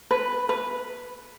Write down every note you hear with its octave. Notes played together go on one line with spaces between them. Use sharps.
B4
B4